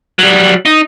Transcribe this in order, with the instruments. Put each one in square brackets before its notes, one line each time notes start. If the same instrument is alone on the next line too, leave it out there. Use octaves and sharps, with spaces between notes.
[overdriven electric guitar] F#3 G3
D#4